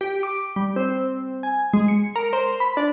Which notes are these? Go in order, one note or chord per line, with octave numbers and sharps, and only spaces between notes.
G4
D6
G3
C4
G#5
G#3
C#7
A#4
C5
B5
D4